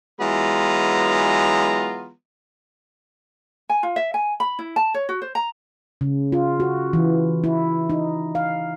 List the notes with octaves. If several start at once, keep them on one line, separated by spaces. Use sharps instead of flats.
E3 F#3 G#3 B3 F4 A#5
G#5
F4
E5
G#5
B5
E4
A5
C#5
F#4
C5
A#5
C#3
F4
F#4
E3
E4
D#4
F5